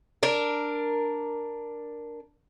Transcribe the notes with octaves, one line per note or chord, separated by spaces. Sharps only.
D4 A#4